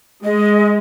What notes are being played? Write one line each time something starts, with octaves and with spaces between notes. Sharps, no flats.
G#3 D#5